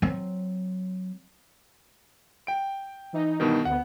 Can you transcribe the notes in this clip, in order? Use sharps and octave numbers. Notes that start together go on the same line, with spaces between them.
F#3 C4
G5 D7
E3 D#4
G2 B2 D#3
D2 B3 F#5